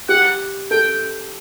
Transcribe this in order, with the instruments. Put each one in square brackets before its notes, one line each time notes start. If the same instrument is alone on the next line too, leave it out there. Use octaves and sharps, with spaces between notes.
[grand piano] G4 [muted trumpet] F#5
[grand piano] A4 [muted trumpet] G5